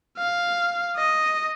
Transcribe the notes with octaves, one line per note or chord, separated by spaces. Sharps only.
F5
D#5